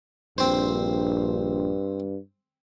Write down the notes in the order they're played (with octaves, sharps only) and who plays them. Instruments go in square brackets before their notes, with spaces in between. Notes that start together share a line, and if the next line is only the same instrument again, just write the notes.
[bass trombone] A#1 [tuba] G2 [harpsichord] C4 C5